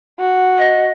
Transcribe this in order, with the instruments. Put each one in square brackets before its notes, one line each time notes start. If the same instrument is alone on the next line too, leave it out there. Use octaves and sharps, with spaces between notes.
[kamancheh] F#4
[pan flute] D#5